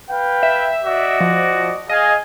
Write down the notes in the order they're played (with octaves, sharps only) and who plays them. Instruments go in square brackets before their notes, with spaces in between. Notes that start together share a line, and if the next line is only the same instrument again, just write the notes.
[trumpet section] B4 F5 G5
[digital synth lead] E5
[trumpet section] F#4 D5 D#5
[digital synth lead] F3
[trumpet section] G#4 F5 G#5 [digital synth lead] D#5